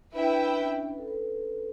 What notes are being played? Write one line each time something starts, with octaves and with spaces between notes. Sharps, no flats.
D4 E4 B4 E5 G5
C#4
B4
A4
B4